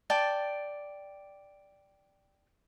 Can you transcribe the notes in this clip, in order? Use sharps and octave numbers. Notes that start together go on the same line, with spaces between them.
D5 G5 A5